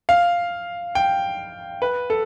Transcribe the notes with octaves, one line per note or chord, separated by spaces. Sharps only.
F5
G5
B4
A4